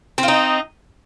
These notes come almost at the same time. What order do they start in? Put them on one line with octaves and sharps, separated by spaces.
C4 F4 D#4